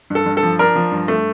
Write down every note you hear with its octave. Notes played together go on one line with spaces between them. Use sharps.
G2 A4
G2
A4
F3
D4 A#4
F3
G2
A3